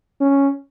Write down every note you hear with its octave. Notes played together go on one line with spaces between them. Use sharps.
C#4